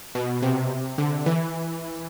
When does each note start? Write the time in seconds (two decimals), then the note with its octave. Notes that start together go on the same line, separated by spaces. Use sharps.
0.15 B2
0.42 C3
0.98 D3
1.26 E3